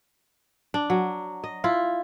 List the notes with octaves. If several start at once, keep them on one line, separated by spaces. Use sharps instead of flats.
D4
F#3
D#5
E4 F4